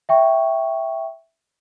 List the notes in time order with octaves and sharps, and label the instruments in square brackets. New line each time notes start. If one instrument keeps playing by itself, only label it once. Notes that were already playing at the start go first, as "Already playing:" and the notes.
[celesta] E5 G5 C#6